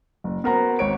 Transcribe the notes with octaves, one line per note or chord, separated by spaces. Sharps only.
F#1
B3 F#4 A#4 C5 F#5 A#5
G#1 C#5 D7